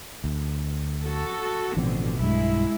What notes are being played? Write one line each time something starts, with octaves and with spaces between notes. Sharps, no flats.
D2
F#4 A4
A1 B2 D3 F3 C4
B1 G2 G#3 E4